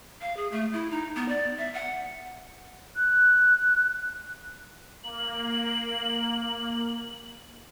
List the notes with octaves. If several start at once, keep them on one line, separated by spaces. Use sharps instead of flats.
F5
G#4
A3
E4
D#4
B3
D5
E5
F#5
F#6
A#3 F#7